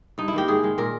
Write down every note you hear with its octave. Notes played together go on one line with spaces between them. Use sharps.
G2 D#4
E4
D#3 A#3 G4
G#2 G#4
D#3 G#3
A#2 A#4